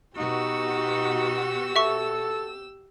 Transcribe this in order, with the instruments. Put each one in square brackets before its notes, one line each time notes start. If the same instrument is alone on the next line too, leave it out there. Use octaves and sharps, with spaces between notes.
[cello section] B2 F#4 [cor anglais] D#4 [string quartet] G4 E6
[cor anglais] A4 [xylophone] E5 C#6